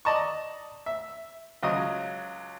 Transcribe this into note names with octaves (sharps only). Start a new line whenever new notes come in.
D5 D#5 A5 A#5 C#6
E5
C#2 C#3 F#3 D#5 D#6